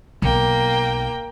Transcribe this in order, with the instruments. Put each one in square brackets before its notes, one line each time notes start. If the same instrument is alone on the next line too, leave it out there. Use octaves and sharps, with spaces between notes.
[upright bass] B1 [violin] A#3 G5